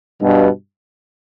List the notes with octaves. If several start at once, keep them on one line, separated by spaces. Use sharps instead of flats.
G2 B2